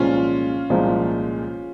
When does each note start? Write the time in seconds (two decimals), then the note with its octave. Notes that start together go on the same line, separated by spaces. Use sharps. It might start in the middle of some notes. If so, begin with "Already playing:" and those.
Already playing: C2 A#2 F3 G#3 C#4 F4
0.70 C2 A#2 F3 G#3